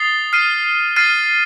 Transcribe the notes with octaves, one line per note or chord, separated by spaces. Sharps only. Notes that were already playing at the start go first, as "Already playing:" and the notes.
Already playing: D#6 A6 C7 G7
F6 C7 D#7
F6 A6 C7 D#7